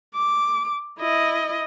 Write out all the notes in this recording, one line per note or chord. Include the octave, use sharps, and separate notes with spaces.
D6
E4 D#5